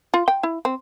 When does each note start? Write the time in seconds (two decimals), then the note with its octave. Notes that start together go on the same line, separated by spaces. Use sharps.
0.14 F4
0.28 G5
0.43 E4
0.65 C4